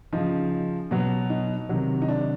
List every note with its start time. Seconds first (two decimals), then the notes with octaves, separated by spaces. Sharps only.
0.13 C#3 F3 D#4
0.91 B2 F#3
1.30 D#4
1.69 C3 D#3 F#3
2.02 D#4
2.08 D4